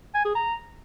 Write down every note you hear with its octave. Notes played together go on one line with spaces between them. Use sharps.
G#5
G#4
A#5